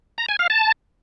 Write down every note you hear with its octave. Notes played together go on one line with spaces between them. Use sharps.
A#5
G#5
F5
A5